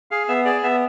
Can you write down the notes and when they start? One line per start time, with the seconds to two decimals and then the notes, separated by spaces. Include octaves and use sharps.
0.11 G#4 F5
0.28 B3 E5
0.45 G#4 D5
0.63 B3 E5